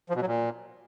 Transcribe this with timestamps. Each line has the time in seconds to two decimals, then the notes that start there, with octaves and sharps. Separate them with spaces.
0.10 F3
0.15 B2
0.21 F#3
0.27 A#2